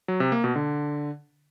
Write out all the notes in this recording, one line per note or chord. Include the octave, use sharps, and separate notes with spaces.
F#3
C3
A#3
B2
D3